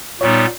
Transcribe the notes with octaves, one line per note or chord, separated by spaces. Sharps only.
A#2 G3 B3 D#4 C#5